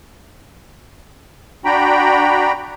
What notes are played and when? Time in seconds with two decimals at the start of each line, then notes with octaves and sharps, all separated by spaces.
1.65 D4 F#4 G5 A#5 B5